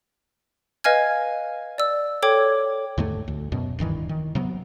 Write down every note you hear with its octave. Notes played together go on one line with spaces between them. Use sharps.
B4 D#5 F5 G#5 F6 G#6
D5 E6
A4 C#5 G5 D6 G#6
D#2 G#2 D3 A3
D2
F#2 B2
D1 G2 D#3 E3
D#3
C3 F#3 B3